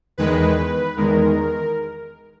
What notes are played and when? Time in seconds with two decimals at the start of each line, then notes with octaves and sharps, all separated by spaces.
0.18 E2 D#3 G#3 B4
0.97 E2 D#3 G#3 A#4